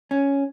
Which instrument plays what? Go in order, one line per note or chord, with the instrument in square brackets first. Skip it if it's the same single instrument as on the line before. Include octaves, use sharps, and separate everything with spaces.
[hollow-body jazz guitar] C#4